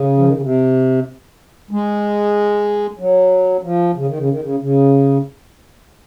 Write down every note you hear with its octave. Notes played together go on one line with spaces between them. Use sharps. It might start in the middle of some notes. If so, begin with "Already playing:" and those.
Already playing: C#3
F3
D#3
C#3
C3
G#3
F#3
F3
C#3
D#3
C#3
D#3
C#3
C#3